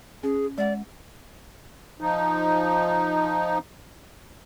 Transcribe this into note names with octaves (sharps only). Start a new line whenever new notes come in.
C#4 G#4
G#3 D5 F#5
F3 D#4